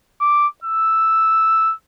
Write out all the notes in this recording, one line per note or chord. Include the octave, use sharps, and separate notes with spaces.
D6
E6